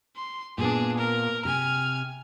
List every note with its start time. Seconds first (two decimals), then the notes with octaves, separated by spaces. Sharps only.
0.16 C6
0.58 A#2 B3 D4 G#4
0.98 A#4
1.45 C3 G#5 F6